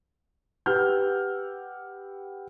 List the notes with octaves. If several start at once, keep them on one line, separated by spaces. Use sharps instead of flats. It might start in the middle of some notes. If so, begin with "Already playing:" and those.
G4 B4 F#5 E6 F6 G6